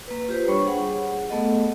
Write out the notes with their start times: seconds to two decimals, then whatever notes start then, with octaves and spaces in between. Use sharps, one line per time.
0.08 A#3 B4
0.28 F4 G4 B4 C5
0.48 G3 D4 C#5 B5 C#6
0.66 G#4 F#5
1.29 A3 B3 A4 D#5 F#5